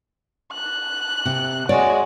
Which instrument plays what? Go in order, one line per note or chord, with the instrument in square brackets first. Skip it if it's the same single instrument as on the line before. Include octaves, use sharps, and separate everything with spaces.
[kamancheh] F#6
[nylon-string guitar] C3
[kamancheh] G#3 F#4 [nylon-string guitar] C#5 D5